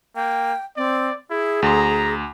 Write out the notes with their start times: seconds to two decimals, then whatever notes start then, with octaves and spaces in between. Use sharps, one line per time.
0.16 A#3 G5
0.77 C4 D5
1.30 E4 G#4
1.62 D2 A#5 C6